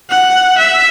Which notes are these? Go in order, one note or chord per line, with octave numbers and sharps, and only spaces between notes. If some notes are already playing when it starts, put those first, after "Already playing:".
F#5
E5